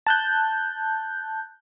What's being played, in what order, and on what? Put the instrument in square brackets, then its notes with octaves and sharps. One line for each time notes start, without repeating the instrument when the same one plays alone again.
[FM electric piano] A5 F#6 G6